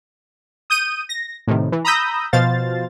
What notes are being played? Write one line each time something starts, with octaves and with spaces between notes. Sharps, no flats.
D#6 G6 D#7
A#6
A2 C3 D#3
E3
A#5 B5 D#6 E6 G6 A#6
B2 F3 C5 F5 A6